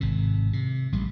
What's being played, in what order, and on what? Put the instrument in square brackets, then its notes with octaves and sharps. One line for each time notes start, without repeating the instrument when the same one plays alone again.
[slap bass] G#1 C3
C3
A1 G3